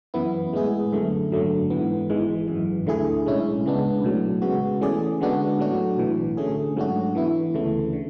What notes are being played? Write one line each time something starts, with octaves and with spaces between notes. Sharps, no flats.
F#2 E3 B3 E4
A2 G#3 B3 E4 G#4
F#2 D3 A3
G#1 F#2 D3 F#3 A3
G#2 E3 B3
G#1 G#2 E3 G#3
G#1 F#2 E3
D2 D3 A3 E4 G#4
B1 A2 G#3 C#4 E4
C#2 C#3 G#3 B3 D4
B1 A2 F#3
C#3 G#3 B3 F#4
E3 A3 C#4 G#4 D5
D3 G#3 B3 D4 F#4
A2 F#3 A3 D4 F#4
B1 A2 E3
D3 A3 C#4 G#4
G#2 F#3 A3 D4 F#4
E3 B3 E4
D2 C#3 E3 A3
D3